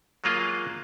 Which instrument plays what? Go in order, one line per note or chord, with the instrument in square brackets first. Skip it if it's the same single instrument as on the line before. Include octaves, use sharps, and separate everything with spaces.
[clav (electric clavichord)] F#3 G#3 A#3 F4 G#4 D#5